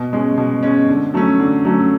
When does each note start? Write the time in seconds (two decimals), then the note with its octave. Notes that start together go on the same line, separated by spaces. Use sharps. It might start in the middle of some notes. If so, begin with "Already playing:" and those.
Already playing: B2
0.13 G#3 C#4
0.38 B2
0.63 G#3 C#4
0.89 D3
1.14 F#3 A3 C#4
1.40 D3
1.65 F#3 A3 C#4